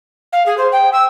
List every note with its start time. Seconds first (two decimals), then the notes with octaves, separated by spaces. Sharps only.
0.33 F5
0.46 G#4
0.58 C5
0.72 G5
0.93 E6